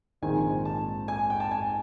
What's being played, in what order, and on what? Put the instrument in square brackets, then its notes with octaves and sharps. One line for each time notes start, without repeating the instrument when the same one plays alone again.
[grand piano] A#1 G#2 D#3 G#3 C4 [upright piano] G#5
[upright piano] A5
G#5
G5
A5
G#5